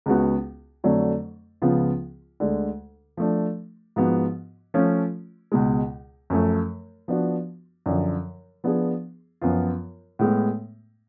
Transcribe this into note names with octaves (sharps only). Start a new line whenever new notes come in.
C#2 C#3 G#3 B3 F#4
F2 D3 F#3 A3 D4
C#2 C#3 F3 B3 F4
D2 D3 G#3
F3 A3 D4
G#2 F3 B3 F#4
F3 A3 C#4 F4
C#2 B2 G#3
F#2 F3 A3
F3 B3 D4 F#4
F#2 D3 F3
F3 B3 D4 G#4
F#2 F3 B3 F4
A2 G#3 B3